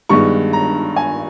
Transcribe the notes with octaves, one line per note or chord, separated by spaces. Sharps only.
G2 D#3 G#3 B3 C#6
A#5
G#5